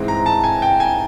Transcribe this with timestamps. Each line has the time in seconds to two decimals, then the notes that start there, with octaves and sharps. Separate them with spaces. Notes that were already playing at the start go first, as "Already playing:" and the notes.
Already playing: G#2 E3 G#3 C4
0.08 A#5
0.26 A5
0.44 G#5
0.62 G5
0.80 G#5